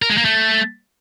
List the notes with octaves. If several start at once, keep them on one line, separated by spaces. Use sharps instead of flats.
A#4
G#3
A#3
A3